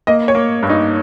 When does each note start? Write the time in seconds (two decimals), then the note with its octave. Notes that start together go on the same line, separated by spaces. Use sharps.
0.07 A#3 D#5
0.28 C#5
0.35 A#3
0.63 G2
0.69 D#4